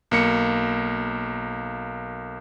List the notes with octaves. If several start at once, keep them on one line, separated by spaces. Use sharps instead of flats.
B1 A#3 C#7